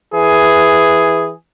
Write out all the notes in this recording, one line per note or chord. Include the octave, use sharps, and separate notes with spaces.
E3 G#4